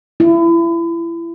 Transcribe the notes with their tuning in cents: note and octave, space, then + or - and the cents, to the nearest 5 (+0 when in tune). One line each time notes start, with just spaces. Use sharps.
E4 +30